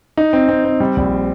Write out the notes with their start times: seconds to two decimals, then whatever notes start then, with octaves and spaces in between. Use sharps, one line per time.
0.17 D#4
0.33 C4
0.49 C4
0.65 C4
0.80 G3
0.97 A#1